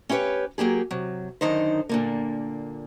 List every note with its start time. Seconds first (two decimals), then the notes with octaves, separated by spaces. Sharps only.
0.09 C#4 E4 G4 B4 C#5
0.58 F#3 A#3 G4 G#4
0.91 C3 F#3
1.41 F#2 D3 D#3 D#4 C5
1.89 A#2 D3 A#3